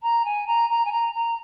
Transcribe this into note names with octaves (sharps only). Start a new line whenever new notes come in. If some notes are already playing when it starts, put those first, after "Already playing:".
A#5
G#5
A#5
A#5
G#5
A#5
A#5